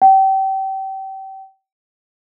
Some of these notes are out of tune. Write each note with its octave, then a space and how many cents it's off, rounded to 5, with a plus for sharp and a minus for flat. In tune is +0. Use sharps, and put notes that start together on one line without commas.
G5 -30